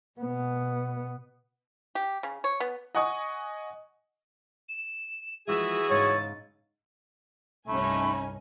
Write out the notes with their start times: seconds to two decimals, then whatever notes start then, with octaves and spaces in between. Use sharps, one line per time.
0.20 B2 B3
1.95 G4
2.23 C#3
2.44 C#5
2.60 B3
2.95 D#5 F#5 G#5 C#6 D#6
4.69 E7
5.48 E3 F3 G#3 F#4 G#4 E5
5.90 G#2 C#3 C#5 A6
7.68 C2 G2 A3 C#4 D#4 G#5 B5